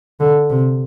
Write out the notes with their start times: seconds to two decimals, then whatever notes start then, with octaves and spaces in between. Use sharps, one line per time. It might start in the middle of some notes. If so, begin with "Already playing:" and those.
0.20 D3
0.50 C3